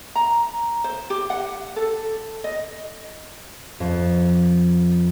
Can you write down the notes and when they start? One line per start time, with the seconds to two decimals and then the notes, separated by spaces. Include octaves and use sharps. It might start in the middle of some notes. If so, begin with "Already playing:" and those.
0.15 A#5
0.84 C5
1.10 G4
1.30 F#5
1.76 A4
2.44 D#5
3.80 F2